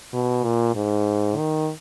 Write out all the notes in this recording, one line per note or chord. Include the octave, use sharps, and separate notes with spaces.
B2
A#2
G#2
D#3